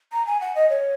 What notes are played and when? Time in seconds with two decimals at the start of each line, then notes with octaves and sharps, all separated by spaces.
0.12 A#5
0.27 G#5
0.41 F#5
0.55 D#5
0.70 C#5